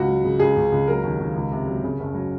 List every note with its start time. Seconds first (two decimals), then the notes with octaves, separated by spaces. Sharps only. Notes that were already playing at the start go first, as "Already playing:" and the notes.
Already playing: C#2 F#4
0.08 F#3
0.24 C#3
0.40 C#2 G#4
0.56 C#2
0.72 C#2
0.88 F#3 A#4
1.04 D#2
1.19 D#2
1.36 C#2
1.52 C3
1.67 F#3
1.84 C#3
2.00 F#1
2.15 F#3